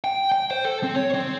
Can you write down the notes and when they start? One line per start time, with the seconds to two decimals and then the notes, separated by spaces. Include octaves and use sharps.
0.04 G5
0.32 G5
0.51 C5
0.65 A4
0.83 C4
0.96 C#5
1.15 C4